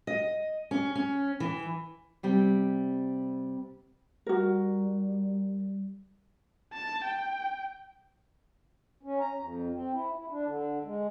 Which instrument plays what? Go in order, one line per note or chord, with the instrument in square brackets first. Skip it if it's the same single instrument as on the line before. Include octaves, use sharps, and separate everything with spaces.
[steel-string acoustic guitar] D#5
C#4
C#4
E3
[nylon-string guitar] C3 G3 C4
[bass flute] G3 [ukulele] F#4 A#4
[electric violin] A5
G5
[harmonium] C#4
A#5
F2
C4
E4
E4
D4
D3
G#3